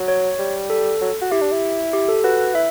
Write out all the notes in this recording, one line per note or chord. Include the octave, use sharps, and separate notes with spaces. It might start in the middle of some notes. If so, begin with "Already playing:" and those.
Already playing: F#3
C#5
G3
A4
F#3
F#4
E4 G4
D4
E4
G4
A4
F#4 B4
E4 E5